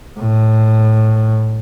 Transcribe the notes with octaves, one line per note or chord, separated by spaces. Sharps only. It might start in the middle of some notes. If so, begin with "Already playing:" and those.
A2